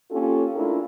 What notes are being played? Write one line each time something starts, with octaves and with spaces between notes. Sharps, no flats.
A#3 C#4 F4 G4 A4
A3 D4 E4 F4 G#4 A#4